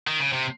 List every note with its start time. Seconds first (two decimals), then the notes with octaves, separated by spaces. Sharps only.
0.07 D#3
0.20 C#3
0.33 C3